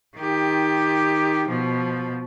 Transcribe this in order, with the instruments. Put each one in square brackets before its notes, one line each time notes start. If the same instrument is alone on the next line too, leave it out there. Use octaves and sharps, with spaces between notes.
[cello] D#3 G4
B2 F3